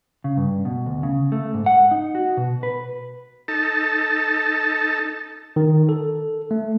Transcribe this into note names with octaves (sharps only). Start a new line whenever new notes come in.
C#3
G2
B2
D2
C#3
A3
G#2
F#5
D#4
F#4
B2
B4
D#4 A4 A5
D#3
A4
A3